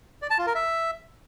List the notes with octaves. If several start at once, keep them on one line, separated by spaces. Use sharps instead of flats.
D5
A5
F4
A#4
E5